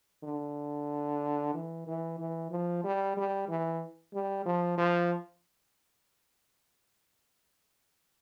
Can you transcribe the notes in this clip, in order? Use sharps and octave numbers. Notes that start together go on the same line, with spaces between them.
D3
E3
E3
E3
F3
G3
G3
E3
G3
F3
F3